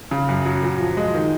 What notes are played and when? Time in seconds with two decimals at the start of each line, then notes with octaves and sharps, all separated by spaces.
0.11 C#3
0.29 F#2
0.46 F#3
0.63 A#2
0.80 F3
0.97 G#3
1.14 D#3